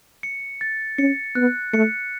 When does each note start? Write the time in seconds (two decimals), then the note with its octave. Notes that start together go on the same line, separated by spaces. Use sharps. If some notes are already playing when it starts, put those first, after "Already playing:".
0.23 C#7
0.61 A6
0.98 C#4 C#7
1.35 B3 F#6
1.73 A3 C#7